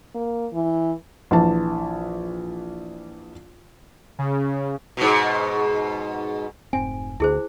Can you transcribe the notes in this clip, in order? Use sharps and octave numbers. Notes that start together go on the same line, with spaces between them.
A#3
E3
A#1 E3 A5
C#3
G#2 B2
F1 G#2 C4 G#5
D2 D3 E4 G#4 C5